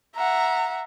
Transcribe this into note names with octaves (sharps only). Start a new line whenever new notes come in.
E5 F#5 A#5